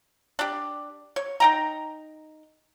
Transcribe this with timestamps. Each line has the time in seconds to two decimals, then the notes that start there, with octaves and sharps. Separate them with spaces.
0.39 D4 G4
1.16 C#5
1.40 D#4 G5 A#5